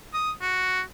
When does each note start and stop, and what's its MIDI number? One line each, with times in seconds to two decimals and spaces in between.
0.13 0.31 87
0.41 0.81 66